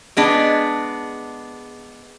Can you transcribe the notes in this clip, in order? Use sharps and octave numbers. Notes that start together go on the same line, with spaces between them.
G#3 B3 D4